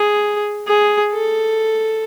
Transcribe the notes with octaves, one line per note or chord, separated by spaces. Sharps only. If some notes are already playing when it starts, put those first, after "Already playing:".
Already playing: G#4
G#4
A4